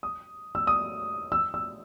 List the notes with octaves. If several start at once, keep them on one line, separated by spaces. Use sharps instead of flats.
D#6
E6
D#6
E6
E6